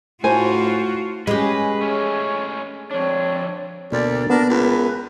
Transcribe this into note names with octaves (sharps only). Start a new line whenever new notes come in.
A2 F4 F#4 C5 G#5
G#3 C#4 G4 B4
A3 C#4 C#5
F2 C4 D4 C#5
D2 B2 A#3 D4 D5
B3 D4 A#4
C#2 A#4 B4